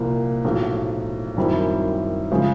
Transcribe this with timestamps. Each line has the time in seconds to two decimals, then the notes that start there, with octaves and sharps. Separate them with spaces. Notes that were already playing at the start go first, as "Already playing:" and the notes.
Already playing: C2 A#2 F3 A#3
0.44 B1 A2 F3 A3
1.36 F#2 D#3 G3 C4 E4
2.32 C#3 F3 G#3